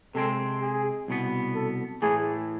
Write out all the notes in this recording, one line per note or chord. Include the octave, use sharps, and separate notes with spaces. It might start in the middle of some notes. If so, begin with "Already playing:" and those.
C3 G#3 C4 A4
G#4
C2 B2 B3
A4
A2 E3 A3 G#4